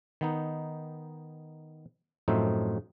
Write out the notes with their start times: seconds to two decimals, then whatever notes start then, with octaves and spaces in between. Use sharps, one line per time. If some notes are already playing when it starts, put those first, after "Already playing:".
0.21 D#3 B3 D#4
2.28 F#2 A2 F3 A3 C4 D#4